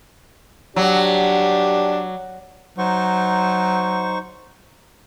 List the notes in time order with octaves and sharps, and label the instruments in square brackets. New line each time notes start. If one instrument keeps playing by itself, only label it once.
[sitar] F#3 [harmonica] D4 G4
[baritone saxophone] F#3 [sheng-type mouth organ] D#4 C5 C#6